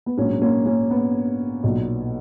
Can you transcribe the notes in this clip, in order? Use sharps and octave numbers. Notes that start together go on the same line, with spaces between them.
B3
A#1 G#2 F#3 A#3 C#4
A#3 C#4
A#3 C#4
B3
B1 A#2 F#3